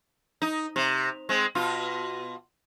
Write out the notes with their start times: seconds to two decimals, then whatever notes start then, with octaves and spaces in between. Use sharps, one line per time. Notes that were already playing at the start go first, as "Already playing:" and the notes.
0.42 D#4
0.76 C3
1.29 G#3 C4
1.55 B2 F4